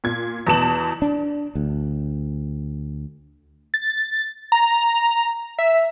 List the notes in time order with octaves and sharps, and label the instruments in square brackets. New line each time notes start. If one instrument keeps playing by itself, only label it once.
[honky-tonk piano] A#2 G#6
E2 B2 E3 A5 E7 F#7
[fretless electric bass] D4
D2
[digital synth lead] A6
A#5
E5